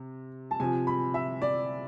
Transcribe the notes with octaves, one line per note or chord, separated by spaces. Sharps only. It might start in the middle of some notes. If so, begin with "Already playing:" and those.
Already playing: C3
A5
C3 F3 G#5
B5
E5
D5